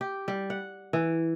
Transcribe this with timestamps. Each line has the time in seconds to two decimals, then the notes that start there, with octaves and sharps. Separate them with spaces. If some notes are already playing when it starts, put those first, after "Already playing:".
0.01 G4
0.28 G3
0.50 F#5
0.93 E3